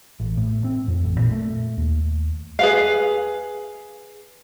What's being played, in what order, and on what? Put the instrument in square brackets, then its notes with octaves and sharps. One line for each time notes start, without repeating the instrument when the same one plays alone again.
[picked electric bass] A1
A2
C4
F2
A1
A#2
A3
D#2
[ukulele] G#4 B4 F5